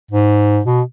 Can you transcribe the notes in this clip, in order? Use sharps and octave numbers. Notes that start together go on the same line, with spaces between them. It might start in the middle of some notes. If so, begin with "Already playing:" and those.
G#2
B2